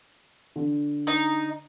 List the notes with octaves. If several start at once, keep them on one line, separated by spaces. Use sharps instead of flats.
D3
D#4